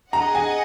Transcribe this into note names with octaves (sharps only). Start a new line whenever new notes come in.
G#4 D#5 F#5 A#5
G#5